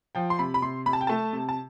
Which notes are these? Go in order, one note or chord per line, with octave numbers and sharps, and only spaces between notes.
F3 G5
C6
C3 B5
B5
C3 C6
C3 B5
A5
G5
A3 A5
C3
A5